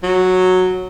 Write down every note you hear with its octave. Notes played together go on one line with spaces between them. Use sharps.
F#3